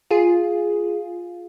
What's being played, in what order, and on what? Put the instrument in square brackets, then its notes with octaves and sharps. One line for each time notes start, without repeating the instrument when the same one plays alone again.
[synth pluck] F4 G#4